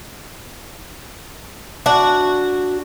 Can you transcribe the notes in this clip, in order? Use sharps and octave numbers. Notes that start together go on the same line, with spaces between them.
D4 F#4